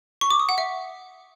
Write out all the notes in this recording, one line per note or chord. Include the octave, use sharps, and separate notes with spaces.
C#6
D6
D#6
F#5
E5